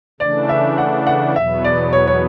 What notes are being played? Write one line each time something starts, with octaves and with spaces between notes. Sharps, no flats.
C#3 E3 A3 D4 D5
E5
F#5
F#5
E2 B2 F#3 B3 E5
D5
C#5
C#5